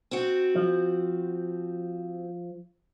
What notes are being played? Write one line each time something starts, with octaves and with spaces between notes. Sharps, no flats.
C4 F#4
F3